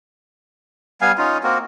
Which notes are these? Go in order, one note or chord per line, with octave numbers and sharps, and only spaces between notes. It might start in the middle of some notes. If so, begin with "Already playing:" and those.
G3 B3 F5 G#5
C#4 D#4 F4
A#3 C4 F#4 A#4